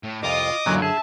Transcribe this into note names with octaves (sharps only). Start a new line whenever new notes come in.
A2
C2 F2 F4 D#5 D6 D#6
F#2 A#2 D3 E3 F#3 F5
G#4 E5 A5